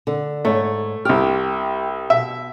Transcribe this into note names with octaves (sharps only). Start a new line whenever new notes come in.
D3
G#2 A3 C#5
C2 G4 F6
B2 E5